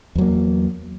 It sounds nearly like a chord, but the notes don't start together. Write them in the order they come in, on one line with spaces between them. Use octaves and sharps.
E2 F#3 A#3